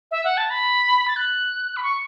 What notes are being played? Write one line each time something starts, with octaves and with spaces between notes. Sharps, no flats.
E5
F#5
A5
B5
A6
F#6
B5
C#6